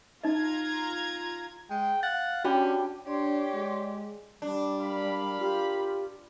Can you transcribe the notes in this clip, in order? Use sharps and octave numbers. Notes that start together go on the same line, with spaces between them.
D#4 F4 D#5 A#5 G#6
G#3 G5
F5 F#5 A6
C#4 D4 F#4 G4 G5 B5
D4 G4 C#5 D5 C6
G#3
G3 D4
A#4 F5 B5
F4 G4